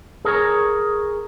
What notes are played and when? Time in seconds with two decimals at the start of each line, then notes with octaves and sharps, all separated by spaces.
0.25 G#4 A#4 C#5